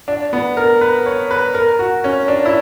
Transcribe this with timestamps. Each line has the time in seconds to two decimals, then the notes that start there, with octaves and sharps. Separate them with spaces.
0.08 D4
0.33 B3
0.57 A#4
0.81 B4
1.06 C#5
1.31 B4
1.54 A#4
1.79 F#4
2.04 C#4
2.28 D4
2.45 E4